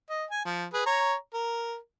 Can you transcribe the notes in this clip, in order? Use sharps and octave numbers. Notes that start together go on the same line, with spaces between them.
D#5
G#5
F3
G#4 B4
C#5 A#5
A#4